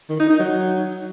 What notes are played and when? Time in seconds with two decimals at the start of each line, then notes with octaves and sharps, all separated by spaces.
0.09 D#3
0.19 D#4
0.30 D#4
0.40 F#3